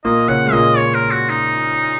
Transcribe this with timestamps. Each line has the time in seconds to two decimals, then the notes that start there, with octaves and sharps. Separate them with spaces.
0.05 A#2 A#3 D#5
0.28 C#3 C#4 F#5
0.46 G#3
0.52 A#2 A#3 D#5
0.77 C#5
0.95 A#4
1.11 F#4
1.29 D#4